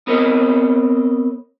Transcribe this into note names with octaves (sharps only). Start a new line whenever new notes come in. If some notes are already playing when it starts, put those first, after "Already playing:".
B3 C4 A#4 C#5 D#5